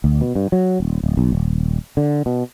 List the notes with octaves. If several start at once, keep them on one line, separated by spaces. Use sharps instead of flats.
D2
B2
G2
F#3
D#1
D1
B1
D#1
D3
B2